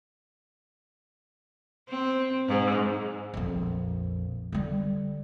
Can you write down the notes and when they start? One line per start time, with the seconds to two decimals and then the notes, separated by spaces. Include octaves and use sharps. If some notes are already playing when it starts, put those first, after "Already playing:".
1.89 C4
2.48 G#2
3.34 A#1 F2
4.52 D3 G3